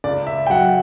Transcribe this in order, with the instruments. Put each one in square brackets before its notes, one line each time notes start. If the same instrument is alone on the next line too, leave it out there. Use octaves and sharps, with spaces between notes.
[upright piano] C#2 D5
E5
G5
F#3 F#5